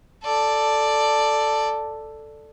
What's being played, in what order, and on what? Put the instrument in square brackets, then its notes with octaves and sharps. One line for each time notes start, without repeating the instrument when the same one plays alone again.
[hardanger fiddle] A4 D5